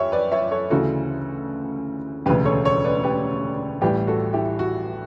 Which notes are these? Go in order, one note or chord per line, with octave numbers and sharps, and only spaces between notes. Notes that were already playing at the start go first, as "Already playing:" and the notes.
Already playing: F#2 G4 C#5 E5
B4 D5
C#5 E5
A4 C#5
D2 C#3 E3 F#4 A4
E1 D2 C#3 G4 B4
A4 C#5
A4 C#5
B4 D5
G4 B4
A1 A2 G3 G4 B4
F#4 A4
E4 G4
F#4